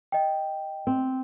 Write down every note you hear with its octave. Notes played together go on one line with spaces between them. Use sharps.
D#5 G5
C4